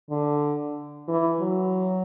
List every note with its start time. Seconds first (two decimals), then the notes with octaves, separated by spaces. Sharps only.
0.10 D3
1.08 E3
1.40 F#3